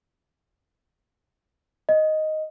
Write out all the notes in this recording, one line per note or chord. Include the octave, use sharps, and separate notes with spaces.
D#5